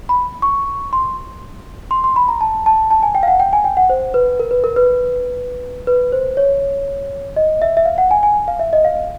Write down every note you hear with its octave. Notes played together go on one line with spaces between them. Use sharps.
B5
C#6
C6
C6
C6
B5
A#5
A5
A5
A5
G#5
G5
F5
F#5
G5
G#5
G5
F#5
C5
B4
A#4
B4
A#4
B4
B4
C5
C#5
D#5
E5
E5
F5
F#5
G#5
G#5
F5
E5
D#5
F5